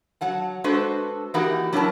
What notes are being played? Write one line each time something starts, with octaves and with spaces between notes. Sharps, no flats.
F#3 F#5 A5
G#3 D4 F#4 A4 B4 C5
E3 A#3 D#4 F#4 G4 A#4
F#3 D4 E4 A#4 C#5 A5